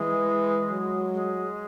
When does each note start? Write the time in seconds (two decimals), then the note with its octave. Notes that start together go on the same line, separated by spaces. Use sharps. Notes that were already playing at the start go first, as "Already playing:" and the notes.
Already playing: E3 G#3
0.70 F#3
1.14 G#3